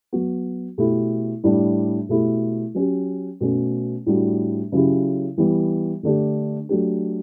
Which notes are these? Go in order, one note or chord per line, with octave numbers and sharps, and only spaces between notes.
F#3 B3 F#4
B2 A3 E4 G4
A2 G3 D4
B2 A3 E4 G4
F#3 C#4 G4
B2 A3 C#4
A2 G3 D4 F#4
C#3 F#3 C#4 E4 G4
E3 G3 B3
D3 A3 D4 G4
F#3 A3 D4 G4